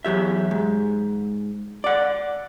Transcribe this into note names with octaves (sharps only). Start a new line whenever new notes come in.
E2 F#3 G4 E5
G#2
D5 F#5